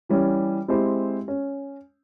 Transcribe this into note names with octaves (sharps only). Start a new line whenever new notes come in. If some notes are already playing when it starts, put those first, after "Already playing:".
E3 G3 C#4
G#3 C4 E4 G4 C5
C#4